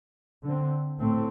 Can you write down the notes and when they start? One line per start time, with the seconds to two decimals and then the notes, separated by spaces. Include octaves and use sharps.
0.44 D3 C4
1.00 A2 A3 C4